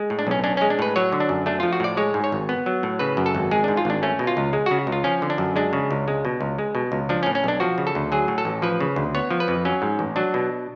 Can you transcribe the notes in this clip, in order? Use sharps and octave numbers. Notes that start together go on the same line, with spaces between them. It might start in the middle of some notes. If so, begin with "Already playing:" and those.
Already playing: G#3
A2
D4
B1 C#4
C#4 D4
G#3 C#4
D4
A2 B4
F#3 C#5
D3
D4
F#2
A3 D4
F3 F4
F#4
A2 D5
G#3 C#5
G#2
C#5
G#1
B3
F#3
A2
C#3 B4
F#2
A4
G#1
G#3 G#4
G#2 D4
F4
G#1 D4
A3 C#4
B2
F4
C#2
G#3
C#3 F#4
C#2
F4
F3 C#4
D3
D4
F#2
G#3 D4
C#3
C#2
G#3
B2
C#2
G#3
B2
C#2
F3 D4
C#4
A2
C#4
B1 D4
F3 F#4
C#3
A4
D2
F#3 G#4
A2
A4
A1
F3 B4
C#3
D2
B3 C#5
F3
B4
F2
F#3 C#4
G#2
A1
F#3 D4
B2